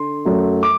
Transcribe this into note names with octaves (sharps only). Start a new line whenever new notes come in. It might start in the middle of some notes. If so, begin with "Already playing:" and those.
Already playing: D3 C6
F#2 F#3 A3
D6